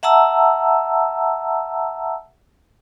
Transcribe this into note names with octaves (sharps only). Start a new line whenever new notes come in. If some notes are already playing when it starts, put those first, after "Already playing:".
E5 F#5 A5 A#5 E6